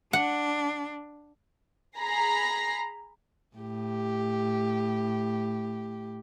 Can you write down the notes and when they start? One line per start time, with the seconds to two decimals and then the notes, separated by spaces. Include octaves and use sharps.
0.13 D4 F#5
1.98 G#4 A#5 B5 A#6 C7
3.57 A2 G4